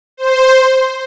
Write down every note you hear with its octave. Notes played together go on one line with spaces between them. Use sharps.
C5